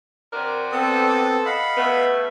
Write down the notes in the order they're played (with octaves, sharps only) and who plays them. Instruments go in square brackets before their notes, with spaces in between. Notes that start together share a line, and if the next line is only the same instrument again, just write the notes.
[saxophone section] C3 F#4 D5 [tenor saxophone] A#4
[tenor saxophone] B3 [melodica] C4 D#6 [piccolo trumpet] A4
[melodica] D#5 F5 F#5 [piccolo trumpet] B5
[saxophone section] C#3 A3 [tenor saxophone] B3